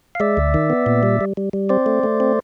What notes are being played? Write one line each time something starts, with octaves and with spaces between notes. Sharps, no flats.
F5
G#3 D5 E5
D2
D#3
B3
A#2
G3
G3
G3
G3
C4 C5 D5
A3
A3
C4